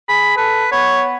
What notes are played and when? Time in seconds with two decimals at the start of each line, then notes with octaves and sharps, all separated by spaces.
0.09 G#4 B5
0.37 A4 B4
0.72 B3 C#5